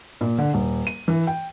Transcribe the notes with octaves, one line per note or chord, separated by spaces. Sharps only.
A#2
D3
D#1
D#7
E3
G5